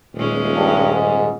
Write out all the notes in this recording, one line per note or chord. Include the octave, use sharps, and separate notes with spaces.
D#1 A#2 G#3 C#4
G2
G#2